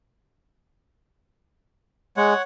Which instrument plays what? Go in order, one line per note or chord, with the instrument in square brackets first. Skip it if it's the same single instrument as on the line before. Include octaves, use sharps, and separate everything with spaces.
[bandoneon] G#3 [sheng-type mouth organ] C#5 F#5